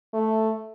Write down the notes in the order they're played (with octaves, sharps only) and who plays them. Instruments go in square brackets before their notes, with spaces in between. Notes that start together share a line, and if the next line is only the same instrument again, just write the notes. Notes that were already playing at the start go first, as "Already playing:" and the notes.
[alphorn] A3